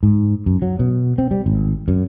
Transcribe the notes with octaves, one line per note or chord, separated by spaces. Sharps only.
G#2
F#2
F#3
B2
C4
G3
G#1
F#2